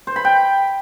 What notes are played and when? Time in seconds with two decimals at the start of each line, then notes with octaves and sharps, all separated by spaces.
0.07 C5
0.16 B5
0.25 G5